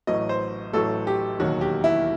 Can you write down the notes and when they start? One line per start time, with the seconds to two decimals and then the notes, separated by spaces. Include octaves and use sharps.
0.07 A1 A2 F#3 D#5
0.29 C5
0.73 A1 A2 F#3 A4
1.07 G4
1.39 E1 D#2 D#3 F#3 F#4
1.61 G4
1.84 E4